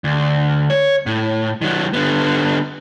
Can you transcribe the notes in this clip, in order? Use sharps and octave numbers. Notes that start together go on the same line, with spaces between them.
D2
C#5
A2
D#3 F#3
D3 B3